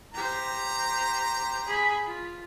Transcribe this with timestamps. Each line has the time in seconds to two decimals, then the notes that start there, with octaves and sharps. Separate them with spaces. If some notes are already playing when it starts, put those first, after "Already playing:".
0.14 G4 C5 A#5
1.66 G#4 B5
2.06 F4